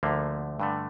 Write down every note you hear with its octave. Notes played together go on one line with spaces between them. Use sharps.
D2 D3 F3 A3 A#3
G2 D3 A3